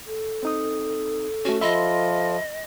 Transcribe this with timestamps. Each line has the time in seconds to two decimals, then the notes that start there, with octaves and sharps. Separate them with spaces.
0.07 A4
0.43 C4 D#4 D#6
1.45 A3 C#4 F#4
1.61 F3 F4 D#5 E5 B5 C6